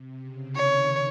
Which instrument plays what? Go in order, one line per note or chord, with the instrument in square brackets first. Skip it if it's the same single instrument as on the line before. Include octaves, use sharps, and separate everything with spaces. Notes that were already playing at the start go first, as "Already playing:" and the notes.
Already playing: [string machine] C3
C#3
[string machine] D#3 [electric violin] C#5